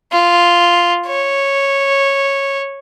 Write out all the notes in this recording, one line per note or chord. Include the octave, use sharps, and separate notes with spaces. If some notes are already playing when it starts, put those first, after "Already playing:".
F4
C#5